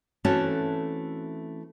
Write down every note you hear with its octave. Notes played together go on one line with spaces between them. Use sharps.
E3 A3 C4 C#4 F#4 A4